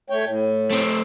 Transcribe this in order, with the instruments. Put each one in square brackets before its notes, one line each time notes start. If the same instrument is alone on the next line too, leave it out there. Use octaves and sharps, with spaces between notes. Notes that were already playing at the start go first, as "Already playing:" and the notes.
[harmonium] A3 C#5 G5
A2
[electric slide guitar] A3 C4